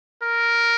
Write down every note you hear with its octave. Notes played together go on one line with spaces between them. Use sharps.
A#4